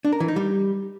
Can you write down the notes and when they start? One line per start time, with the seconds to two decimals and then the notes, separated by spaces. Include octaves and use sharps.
0.05 D4
0.12 A#4
0.20 E3
0.28 D#4
0.36 G3